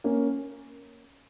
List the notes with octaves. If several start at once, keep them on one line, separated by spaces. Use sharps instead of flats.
A#3 C#4